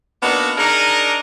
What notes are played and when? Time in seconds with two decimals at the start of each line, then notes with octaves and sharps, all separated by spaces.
0.23 A#3 B3 D4 D#4 F#4
0.58 D4 D#4 G#4 A#4 D5 D#5